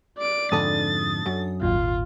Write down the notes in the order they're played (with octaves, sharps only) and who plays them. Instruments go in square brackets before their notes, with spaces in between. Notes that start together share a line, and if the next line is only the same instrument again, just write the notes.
[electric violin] D5 D7
[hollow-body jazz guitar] F2 G#2 D3 [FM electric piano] D4 A4 D#6 [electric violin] A6
[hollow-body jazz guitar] F#2
[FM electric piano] G#1 D#2 A#2 [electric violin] F4